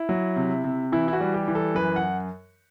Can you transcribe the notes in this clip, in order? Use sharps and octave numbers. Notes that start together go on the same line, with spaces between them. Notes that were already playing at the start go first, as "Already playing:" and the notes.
Already playing: E4
F#3
C3
C3
E3 E4
E4
F#4
G3
G4
E3
A4
F#2 B4
F#5